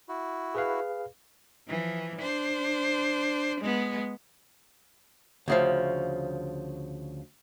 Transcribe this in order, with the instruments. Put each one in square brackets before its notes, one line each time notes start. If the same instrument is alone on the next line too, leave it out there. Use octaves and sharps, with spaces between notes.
[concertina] E4 F#4
[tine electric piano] G#4 B4 F5
[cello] E3 F3
D4 C5
G#3 B3
[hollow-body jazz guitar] D2 C#3 F3